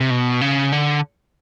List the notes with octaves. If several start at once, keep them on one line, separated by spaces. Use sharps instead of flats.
C3
B2
C#3
D3